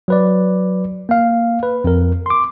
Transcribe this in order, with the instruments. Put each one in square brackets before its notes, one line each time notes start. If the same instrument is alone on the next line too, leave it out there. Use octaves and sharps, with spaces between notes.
[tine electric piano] F#3 B4 D5
A#3 F5
B4
F2 A#4
C6 D6